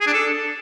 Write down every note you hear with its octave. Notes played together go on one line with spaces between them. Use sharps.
G#4
D4
A4